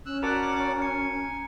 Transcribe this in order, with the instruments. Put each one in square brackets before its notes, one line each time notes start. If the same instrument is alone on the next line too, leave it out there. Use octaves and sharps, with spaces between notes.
[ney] C#4 [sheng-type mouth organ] E6 F#6
[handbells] F#4 A#4 A5 [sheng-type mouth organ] D5 F#5 D6 [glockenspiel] A#5 F#6
[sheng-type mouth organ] G#5 [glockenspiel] C#7